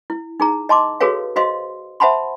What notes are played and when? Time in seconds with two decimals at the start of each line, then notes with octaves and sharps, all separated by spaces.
0.10 E4
0.40 D#4 G#4 A#5
0.69 D#5 A5 C6 D6
1.01 F#4 G#4 A4 B4 C#5 F5
1.36 F#4 C5 D#5 F5 C6
2.00 C5 E5 F#5 A5 B5 C6